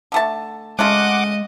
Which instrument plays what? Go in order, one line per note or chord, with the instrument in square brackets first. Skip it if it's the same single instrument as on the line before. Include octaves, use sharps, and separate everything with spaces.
[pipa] D3 A3 A5
[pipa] C#3 A3 F4 [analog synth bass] G#3 [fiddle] D#5 [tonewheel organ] F#5 D6